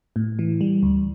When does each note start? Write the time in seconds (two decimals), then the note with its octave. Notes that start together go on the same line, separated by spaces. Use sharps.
0.16 A2
0.39 E3
0.61 G3
0.83 D2